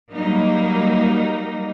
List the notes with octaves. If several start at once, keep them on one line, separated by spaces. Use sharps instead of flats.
F#3 G3 A#3 D#4